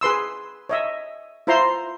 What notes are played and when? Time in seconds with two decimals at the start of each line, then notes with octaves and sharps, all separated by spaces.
0.01 G#4 B4 C6 E6
0.69 C#5 D#5 E5
1.47 E4 F4 C5 A#5 C6